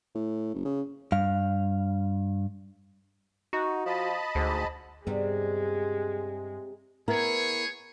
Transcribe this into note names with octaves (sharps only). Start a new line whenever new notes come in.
A2
F#1
C#3
G2 F5
D#4 F#4
F3 D#5 A5 B5
D2 G#2
G2 C3 G3 G#3 B3 G#4
B3 E4 G#4 A#4 C#5